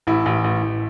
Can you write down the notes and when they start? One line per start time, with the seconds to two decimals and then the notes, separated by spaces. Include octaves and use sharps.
0.07 A1 E4
0.26 A1
0.44 A1
0.63 A1